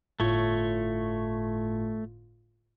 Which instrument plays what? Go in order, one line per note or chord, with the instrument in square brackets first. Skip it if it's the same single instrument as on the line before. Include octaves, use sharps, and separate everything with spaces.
[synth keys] G1 A2 F4 [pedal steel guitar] A3 C#5